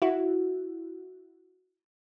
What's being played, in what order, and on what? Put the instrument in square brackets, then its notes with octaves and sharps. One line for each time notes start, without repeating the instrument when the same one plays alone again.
[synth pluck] E4 F#4